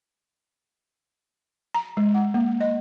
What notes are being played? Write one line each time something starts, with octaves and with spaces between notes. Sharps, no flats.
A#5
G#3
F#5
A#3
D#5